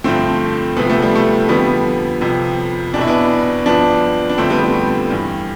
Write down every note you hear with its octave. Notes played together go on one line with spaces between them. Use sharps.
G2 D3 F3 A3 C4
D2 C3 F3 B3
A3
G3
A3
F2 D3 F3 G3 B3
F2 C3 F3
E2 B2 D4 E4
B3 D4
G2 F3 B3 D4
D4
F2 D3 F3 A3 C4
G3 B3
G3
G3
G2 E3